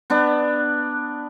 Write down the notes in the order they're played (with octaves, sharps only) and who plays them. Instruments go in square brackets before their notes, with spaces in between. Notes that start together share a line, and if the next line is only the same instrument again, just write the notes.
[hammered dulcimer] B3 D4